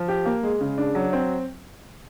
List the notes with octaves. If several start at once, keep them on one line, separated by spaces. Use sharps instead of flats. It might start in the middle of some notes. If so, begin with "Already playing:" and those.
Already playing: F3
G4
A#3
G#3
C#3
D4
F#3
C4